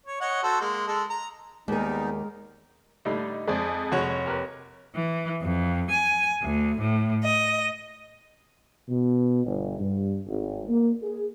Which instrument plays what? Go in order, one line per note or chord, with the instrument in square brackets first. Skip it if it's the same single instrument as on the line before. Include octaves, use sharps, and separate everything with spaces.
[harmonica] C#5
C#5 D#5 F#5
F#4 A4 C5
G#3 A#3
G#3 A4
A#5
[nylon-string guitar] D#2 G#4 [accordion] G3 B3 D#4 [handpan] G#3 A#4
[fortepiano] A2 D3 G3 [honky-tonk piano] D#4
[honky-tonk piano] F2 G#3 [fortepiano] G#4 C5 D5
[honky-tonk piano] F1 C#5 [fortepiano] G#3 F#4 F#5
[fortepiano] G4 A#4 B4
[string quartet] E3
F2
G#5
D2
A2
D#5
[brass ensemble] B2
G1
G2
G#1
A#3
G#4